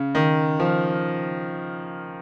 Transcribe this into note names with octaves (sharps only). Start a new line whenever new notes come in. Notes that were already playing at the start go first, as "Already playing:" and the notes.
Already playing: C#3
D#3
F3